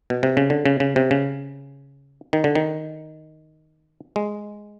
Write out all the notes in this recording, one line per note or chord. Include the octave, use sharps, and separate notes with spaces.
B2
C3
C#3
D3
C#3
C#3
C3
C#3
D#3
D3
D#3
G#3